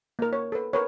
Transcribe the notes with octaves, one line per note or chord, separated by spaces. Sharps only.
A#3 A#4
C#5
A4 B4
A#4 B4 C#5